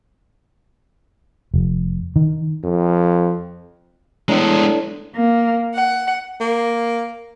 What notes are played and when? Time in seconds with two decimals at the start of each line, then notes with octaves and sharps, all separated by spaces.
1.54 F1
2.16 D#3
2.64 F2
4.28 A2 D3 G#3 B3 A#5
5.15 A#3
5.75 F#5
6.40 A#3